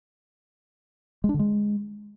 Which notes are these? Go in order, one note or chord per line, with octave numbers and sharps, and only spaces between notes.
G#3
D4
D3
G#3